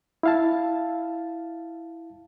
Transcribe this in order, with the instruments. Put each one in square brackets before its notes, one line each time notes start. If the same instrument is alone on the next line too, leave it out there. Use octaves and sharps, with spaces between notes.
[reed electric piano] E4 F5 A5